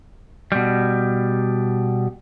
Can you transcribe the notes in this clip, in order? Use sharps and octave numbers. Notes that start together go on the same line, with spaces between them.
B2 G3